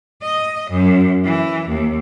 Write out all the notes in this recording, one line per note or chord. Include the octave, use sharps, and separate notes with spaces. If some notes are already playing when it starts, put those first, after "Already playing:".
D#5
F#2
E3
D#2